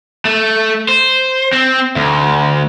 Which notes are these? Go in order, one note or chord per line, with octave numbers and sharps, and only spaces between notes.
A3
C5
C4
D2